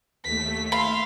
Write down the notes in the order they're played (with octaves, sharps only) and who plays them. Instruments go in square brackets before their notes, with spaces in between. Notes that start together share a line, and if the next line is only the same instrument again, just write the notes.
[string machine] D#2 A3 [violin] B6
[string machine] E5 [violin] F5 C6 [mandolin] B5